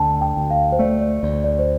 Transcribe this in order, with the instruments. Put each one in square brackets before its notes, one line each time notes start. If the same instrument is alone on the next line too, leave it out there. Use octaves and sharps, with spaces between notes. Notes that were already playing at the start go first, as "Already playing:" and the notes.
Already playing: [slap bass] D2 D3 [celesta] G5 A5
[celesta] G5
[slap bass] D2
[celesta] F5
C5
[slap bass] A3 [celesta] D5
[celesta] D5
[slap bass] D2 [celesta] D5
[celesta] D5
C5